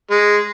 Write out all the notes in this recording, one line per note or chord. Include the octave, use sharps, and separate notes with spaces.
G#3